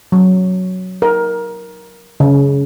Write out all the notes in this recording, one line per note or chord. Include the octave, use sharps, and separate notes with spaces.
F#3
A#4
C#3